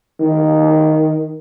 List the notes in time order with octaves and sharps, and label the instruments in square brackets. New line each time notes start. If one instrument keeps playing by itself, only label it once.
[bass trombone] D#3